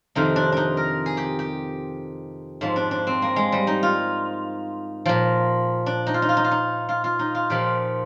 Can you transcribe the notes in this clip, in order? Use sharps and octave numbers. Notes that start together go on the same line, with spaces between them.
F2 C3 D#3 D#4
D4
D4 D#4
A#4
G#4
G4
G4
G#2 F3
D4
D4
C4
A#3
G#3
G3
D#4
F4
A#2 F3
D4
D#4
F4
D#4
F4
D#4
F4
D#4
F4
F4
D#4
F4
A#2 F3 G4